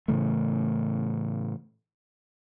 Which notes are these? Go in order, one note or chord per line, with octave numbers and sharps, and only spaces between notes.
A2 C#3 E3 A3